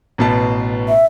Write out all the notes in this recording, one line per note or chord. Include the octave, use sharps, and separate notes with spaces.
A1 B2 A5
E5